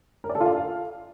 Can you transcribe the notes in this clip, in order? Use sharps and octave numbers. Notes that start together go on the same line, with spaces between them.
A#4
D5
A4
F4
F5